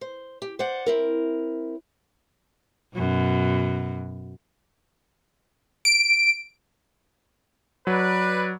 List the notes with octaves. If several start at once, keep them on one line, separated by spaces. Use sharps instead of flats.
C5
G4
C5 D5 F#5
C4 E4 A#4
F#2 B2
D7
F#3 B4 D5